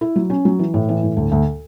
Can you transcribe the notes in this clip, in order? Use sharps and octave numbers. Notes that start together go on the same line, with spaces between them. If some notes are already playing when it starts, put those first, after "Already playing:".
E4
F#3
C#4
F#3
E3
A2
E3
A2
D2
D2